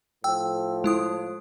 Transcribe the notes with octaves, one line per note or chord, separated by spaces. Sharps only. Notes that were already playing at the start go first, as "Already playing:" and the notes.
A2 F3 G5 E6
G#3 E4 D#6